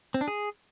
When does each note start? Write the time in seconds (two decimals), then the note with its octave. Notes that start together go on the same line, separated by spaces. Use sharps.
0.14 C4
0.21 D4
0.28 G#4